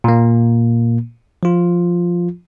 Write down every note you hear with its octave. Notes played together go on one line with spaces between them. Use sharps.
A#2 A#3
F3 F4